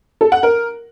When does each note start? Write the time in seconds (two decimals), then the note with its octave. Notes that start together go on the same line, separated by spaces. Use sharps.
0.21 A4
0.32 F#5
0.43 A#4